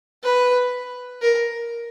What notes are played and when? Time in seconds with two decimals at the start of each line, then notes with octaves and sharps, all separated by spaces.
0.23 B4
1.22 A#4